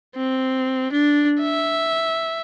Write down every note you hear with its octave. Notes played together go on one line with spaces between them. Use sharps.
C4
D4
E5